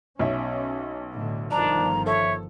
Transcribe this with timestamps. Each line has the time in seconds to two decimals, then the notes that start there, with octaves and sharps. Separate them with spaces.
0.19 B1 C#4 E5
1.13 A2 D3
1.51 G1 D#3 F3 D4 A#5
2.06 A4 C#5 E5